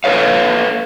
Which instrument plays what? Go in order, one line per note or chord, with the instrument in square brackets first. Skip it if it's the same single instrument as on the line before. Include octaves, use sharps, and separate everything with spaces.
[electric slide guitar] A4 B4 C#5 F5